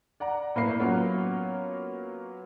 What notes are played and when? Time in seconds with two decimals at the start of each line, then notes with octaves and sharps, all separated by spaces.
0.20 D5 F#5 A#5
0.56 A2 A#3 B4 E5 C7
0.80 F#3 A#3 B3 C#4 F4 C#5